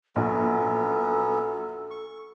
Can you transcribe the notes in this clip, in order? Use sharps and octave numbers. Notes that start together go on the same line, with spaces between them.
A#1 F#3 B3 C#4 A4
C#6